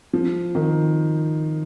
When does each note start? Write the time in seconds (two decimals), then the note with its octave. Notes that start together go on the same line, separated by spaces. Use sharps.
0.13 F3
0.55 D#3